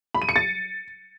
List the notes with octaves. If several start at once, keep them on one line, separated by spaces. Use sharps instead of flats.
B5
D#7
C#7
A6